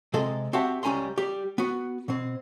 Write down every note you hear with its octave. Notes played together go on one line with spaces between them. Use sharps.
C3 G#3 A4 D#5 C6
C4 F#4 G4 E5 F#5 A5
C#2 G3 C#4 G#5 A#5 C6
G3 G4
B3 F#4
B2 C4